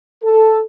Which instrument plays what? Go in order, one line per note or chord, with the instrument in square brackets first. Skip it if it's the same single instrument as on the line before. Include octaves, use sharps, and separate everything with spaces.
[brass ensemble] A4